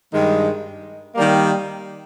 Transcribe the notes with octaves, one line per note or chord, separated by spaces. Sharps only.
G2 D#3 G#3
D#3 G3 A#3